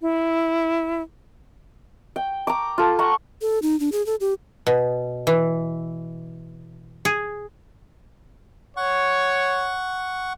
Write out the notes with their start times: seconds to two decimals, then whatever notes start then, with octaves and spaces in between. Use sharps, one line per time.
0.01 E4
2.16 G5
2.47 A#5 D6
2.78 F4 A4
2.99 F#5 A#5 C#6
3.41 A4
3.62 D#4
3.80 D4
3.92 G#4
4.06 A4
4.20 G4
4.67 B2
5.27 E3
7.05 G#4
8.77 C#5 F#5 C#6